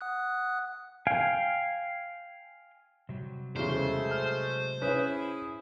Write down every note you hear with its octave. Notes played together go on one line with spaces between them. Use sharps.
F#5 D#6 F#6
F5 G5 G#5
C3 F#3 G3
E2 C#3 G#3 A3 C5
F6
C#4 E4 G#4 B4